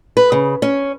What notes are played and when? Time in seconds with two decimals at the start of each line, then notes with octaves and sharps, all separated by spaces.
0.17 B4
0.32 C#3
0.62 C#4